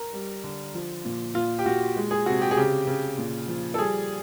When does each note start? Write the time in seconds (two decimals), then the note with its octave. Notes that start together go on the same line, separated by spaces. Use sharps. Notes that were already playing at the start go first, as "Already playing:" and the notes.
Already playing: A#4
0.13 G3
0.44 D3
0.74 F3
1.05 A#2
1.35 A#2 F4
1.59 G4
1.66 A#2 F#4
1.96 G#3
2.11 G#4
2.26 C3 F#4
2.41 G4
2.51 G#4
2.57 C#3 G4
2.87 C#3
3.17 A#2
3.48 F3
3.74 A4
3.78 G3 G#4